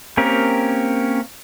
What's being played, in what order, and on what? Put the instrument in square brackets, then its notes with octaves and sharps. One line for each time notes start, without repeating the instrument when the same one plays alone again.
[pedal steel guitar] A#3 C4 C#4 G4 A#4